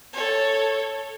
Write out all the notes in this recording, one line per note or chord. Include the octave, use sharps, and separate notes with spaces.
A4 C#5